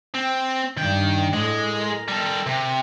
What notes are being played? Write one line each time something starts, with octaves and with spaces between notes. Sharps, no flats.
C4
G2 D#3 D4 G5
A2 G#3
A#4
G3 A4
C3